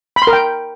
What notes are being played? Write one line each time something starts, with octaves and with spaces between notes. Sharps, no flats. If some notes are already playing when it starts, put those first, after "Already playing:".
B5
C6
A#4
G5